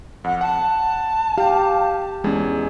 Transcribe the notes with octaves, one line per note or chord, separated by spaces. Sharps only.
F2 F#5
F#5 A5
G4 F5 G5
E2 G#3 C#4 G#4